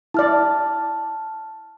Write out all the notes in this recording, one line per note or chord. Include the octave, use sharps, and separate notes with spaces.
E4 D5 A5 F6